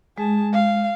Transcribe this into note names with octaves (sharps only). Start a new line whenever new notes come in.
G#3 G#4 A5
F5